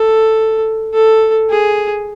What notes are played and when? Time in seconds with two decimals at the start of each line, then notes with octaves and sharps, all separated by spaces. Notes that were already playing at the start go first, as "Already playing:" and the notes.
Already playing: A4
0.93 A4
1.50 G#4